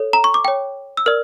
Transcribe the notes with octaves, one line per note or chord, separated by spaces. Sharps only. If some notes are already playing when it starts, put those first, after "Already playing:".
Already playing: A4 C#5
A#5
C#6
D6
C#5 G5
E6
A#4 D5 F6